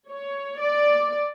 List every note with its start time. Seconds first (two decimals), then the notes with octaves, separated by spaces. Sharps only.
0.10 C#5
0.61 D5